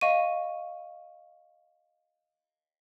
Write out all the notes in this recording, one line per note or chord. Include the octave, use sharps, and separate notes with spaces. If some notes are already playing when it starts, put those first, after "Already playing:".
D#5 F5 C#6 D#7